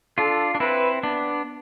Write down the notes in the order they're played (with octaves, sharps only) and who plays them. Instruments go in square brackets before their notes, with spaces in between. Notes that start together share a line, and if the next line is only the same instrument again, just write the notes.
[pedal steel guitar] D4 F4 [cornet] A4
[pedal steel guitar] D4
[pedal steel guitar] C4 E4 [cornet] B4
[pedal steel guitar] B3 D4